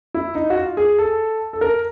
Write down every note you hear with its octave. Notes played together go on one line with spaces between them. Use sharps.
E4
D#4
F#4
F4
G#4
A4
A4
A#4